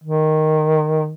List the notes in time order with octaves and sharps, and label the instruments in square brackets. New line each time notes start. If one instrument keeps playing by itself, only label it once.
[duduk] D#3